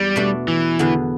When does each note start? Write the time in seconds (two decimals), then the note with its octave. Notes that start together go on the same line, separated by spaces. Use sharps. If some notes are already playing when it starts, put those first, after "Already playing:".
Already playing: E2 G3
0.16 B2 A3 D4
0.48 E3
0.79 E2 D3 B3